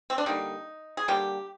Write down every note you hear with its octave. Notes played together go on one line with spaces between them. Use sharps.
C4
D4
D3 G3 A#3 D#4
G#4
D3 G3 A#3 G4